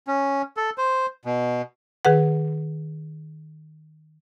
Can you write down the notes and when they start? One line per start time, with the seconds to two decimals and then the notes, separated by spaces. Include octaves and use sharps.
0.07 C#4
0.57 A4
0.78 C5
1.25 B2
2.05 D#3 G#4 B4 F#5